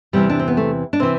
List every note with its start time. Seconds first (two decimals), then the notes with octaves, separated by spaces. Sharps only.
0.13 E2 C3 E3 G3
0.29 D4
0.39 C4
0.48 B3
0.57 A3
0.93 D4
1.00 C3 E3 C4